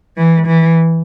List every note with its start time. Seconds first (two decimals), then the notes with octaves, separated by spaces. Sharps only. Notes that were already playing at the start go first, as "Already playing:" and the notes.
0.17 E3
0.47 E3